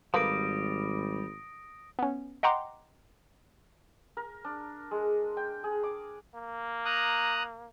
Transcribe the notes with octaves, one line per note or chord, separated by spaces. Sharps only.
G#1 G3 A3 A#3 B4 D#6 A#6 D7
B3 C#4
D#5 F#5 G5 A#5 C6 D6
A#4
D4
G#3
G5
G#4
D6
A#3
A#5 D#6 F#6